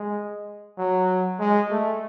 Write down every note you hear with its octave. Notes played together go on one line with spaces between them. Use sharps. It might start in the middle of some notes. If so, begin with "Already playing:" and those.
Already playing: G#3
F#3
G#3
A3